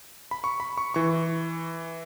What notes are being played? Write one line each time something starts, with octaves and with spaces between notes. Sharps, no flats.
B5
C#6
B5
C#6
E3 C#6